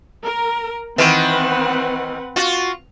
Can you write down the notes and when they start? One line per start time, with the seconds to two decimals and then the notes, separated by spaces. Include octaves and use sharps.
0.22 A#4
0.98 D#3 E3 C4 B4 F#5
2.36 F4 F#4